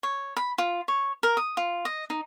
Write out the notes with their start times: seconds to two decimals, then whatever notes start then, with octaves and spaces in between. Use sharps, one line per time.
0.03 C#5
0.37 B5
0.58 F4
0.88 C#5
1.23 A#4
1.37 D#6
1.57 F4
1.85 D#5
2.10 D#4